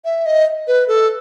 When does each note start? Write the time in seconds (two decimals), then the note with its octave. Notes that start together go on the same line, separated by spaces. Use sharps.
0.05 E5
0.26 D#5
0.68 B4
0.88 A4